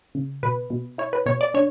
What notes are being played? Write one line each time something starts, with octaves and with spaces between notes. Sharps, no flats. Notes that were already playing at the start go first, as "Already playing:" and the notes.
C#3
B2 B4
B2
E4 C#5
B4
B2 C#5
D5
D4 C#5